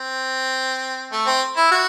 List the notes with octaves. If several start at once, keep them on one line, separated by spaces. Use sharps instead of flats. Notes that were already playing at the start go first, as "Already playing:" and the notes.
Already playing: C4
A3
C4
E4
F#4